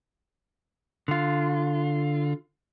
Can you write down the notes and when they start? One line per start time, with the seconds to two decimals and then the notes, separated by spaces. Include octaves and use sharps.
1.08 D3 F4